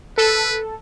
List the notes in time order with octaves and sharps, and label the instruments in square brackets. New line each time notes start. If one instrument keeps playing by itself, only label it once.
[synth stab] A4 [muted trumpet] B4